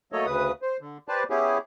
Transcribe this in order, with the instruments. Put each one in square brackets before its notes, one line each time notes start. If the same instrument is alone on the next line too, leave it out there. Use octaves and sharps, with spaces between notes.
[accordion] F#3 A3 A#3 A4 C#5 D#5
D2 C#3 B4 D#6
C5
D3
G4 B4 C5 D5 A5
B3 C#4 E4 G4 G#4